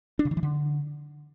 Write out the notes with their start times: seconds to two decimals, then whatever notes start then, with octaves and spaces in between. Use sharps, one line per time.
0.19 D4
0.25 C#3
0.31 D#3
0.37 E3
0.43 D3